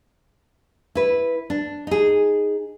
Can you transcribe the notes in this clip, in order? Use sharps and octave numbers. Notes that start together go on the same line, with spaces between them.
E4 B4
D4
D#4 G#4